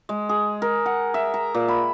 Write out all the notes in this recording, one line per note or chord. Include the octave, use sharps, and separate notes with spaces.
G#3
G#4
A#4
F#5
E5
A#5
A#2
B5